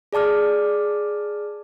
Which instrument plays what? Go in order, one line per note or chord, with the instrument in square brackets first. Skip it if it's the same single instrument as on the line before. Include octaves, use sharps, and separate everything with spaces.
[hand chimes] G#4 D5 A5 D6 F6